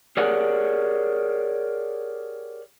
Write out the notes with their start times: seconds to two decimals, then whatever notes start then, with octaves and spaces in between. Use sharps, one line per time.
0.17 G4 G#4 A#4 C#5 D5 F#5